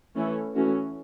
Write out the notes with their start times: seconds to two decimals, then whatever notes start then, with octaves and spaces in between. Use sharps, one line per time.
0.15 E3 A3 C#4 E4 A4
0.55 E3 A3 C#4 F#4